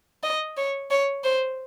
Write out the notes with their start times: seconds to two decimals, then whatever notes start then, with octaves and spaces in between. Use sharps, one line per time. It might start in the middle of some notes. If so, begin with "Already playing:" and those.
0.23 D#5
0.57 C#5
0.91 C#5
1.24 C5